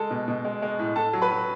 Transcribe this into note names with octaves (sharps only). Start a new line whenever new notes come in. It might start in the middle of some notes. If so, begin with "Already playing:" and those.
Already playing: G#3 A4 A5
B2
B2
G#3
G#3
A2
A2 A4 A5
F#3
B4 B5
F#3